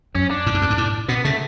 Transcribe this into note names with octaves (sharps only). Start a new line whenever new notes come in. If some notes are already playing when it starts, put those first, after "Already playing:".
F#2 C#4
D4
A2
G#2
F#2
G#2
A2
B2 B3
C#3 A3